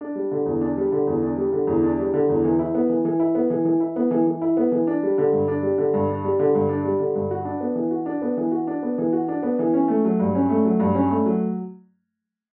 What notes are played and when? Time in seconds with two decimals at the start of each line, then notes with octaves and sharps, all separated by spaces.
0.01 D4
0.15 G3
0.31 D3
0.46 E2
0.61 D4
0.77 G3
0.92 D3
1.07 E2
1.22 D4
1.37 G3
1.53 D3
1.67 E2
1.83 D4
1.98 G3
2.14 D3
2.29 E2
2.44 E3
2.59 E4
2.74 B3
2.89 E3
3.05 E3
3.20 E4
3.35 B3
3.50 E3
3.65 E3
3.80 E4
3.96 B3
4.11 E3
4.27 E3
4.41 E4
4.57 B3
4.72 E3
4.87 D4
5.03 G3
5.18 D3
5.33 G2
5.48 D4
5.63 G3
5.78 D3
5.94 G2
6.09 D4
6.24 G3
6.39 D3
6.55 G2
6.69 D4
6.84 G3
7.00 D3
7.15 G2
7.31 F#4
7.45 D4
7.60 B3
7.75 E3
7.91 F#4
8.06 D4
8.22 B3
8.37 E3
8.51 F#4
8.67 D4
8.82 B3
8.98 E3
9.13 F#4
9.28 D4
9.43 B3
9.59 E3
9.74 C#4
9.88 A3
10.05 F#3
10.20 G2
10.35 C#4
10.49 A3
10.65 F#3
10.80 G2
10.95 C#4
11.10 A3
11.26 F#3